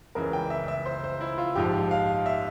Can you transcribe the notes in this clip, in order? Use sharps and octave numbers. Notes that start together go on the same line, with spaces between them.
C#2 C#3 E3 A#4
G5
E5
E5
C5
C5
E4
F4
A#1 G#2 F3 G4
F5
E5